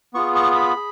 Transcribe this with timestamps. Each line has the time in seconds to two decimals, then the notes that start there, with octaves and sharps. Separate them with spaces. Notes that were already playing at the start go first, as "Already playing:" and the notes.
0.14 B3 F4 G#4 C#6
0.35 C#6
0.55 B5
0.76 G#4